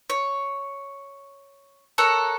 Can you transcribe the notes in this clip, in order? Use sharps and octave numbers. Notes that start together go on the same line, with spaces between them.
C#5
A4 A#4 C#5 F#5